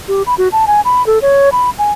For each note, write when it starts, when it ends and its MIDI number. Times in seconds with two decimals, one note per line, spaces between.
0.08 0.23 67
0.26 0.34 83
0.38 0.48 66
0.52 0.65 81
0.67 0.81 80
0.85 1.05 83
1.06 1.19 69
1.22 1.49 73
1.52 1.70 83
1.78 1.92 80